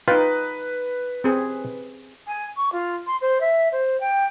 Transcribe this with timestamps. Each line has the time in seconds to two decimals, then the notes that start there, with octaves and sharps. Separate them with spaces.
0.08 D#4 F4 B4 G5
1.24 C4 G#4
2.27 G#5
2.56 C#6
2.72 F4
3.06 C6
3.21 C5
3.40 E5
3.72 C5
4.00 G5